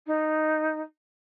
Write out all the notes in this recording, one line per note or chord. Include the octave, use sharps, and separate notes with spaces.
D#4